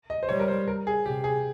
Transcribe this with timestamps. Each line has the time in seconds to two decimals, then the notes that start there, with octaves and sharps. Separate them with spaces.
0.10 D#5
0.23 C5
0.29 G3 C#5
0.40 A#4
0.48 C5
0.68 A#4
0.87 G#4
1.05 C3 G4
1.24 G#4